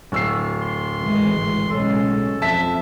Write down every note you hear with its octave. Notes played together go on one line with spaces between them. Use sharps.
D1 E6 C7
C6
G#1 E3 G#3
B1 G#3 C#4 A4
F2 E5 A5 B6